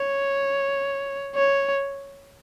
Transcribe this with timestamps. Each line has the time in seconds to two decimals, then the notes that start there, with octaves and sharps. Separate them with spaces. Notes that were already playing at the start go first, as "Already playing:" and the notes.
Already playing: C#5
1.36 C#5